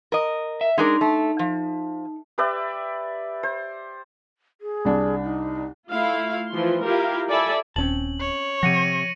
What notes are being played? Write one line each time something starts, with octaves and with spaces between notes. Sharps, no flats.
A#4 D#5
E5
G#3 D4 D#4 A#4
A3
F3
G4 B4 D5 E5
C5
G#4
C2 D4
D#4
A3 E4 F4 F5
E3 F3 C6
E4 F4 G4 A#4 F5
A4 D5 E5 G#5 B5
D#1 C4 C#4 A5 F#7
C#5
C3 F3 F#5 A#6 C#7 D#7